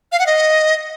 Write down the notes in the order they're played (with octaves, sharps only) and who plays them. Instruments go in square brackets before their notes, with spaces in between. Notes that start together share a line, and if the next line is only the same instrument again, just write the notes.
[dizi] F5
F#5
D#5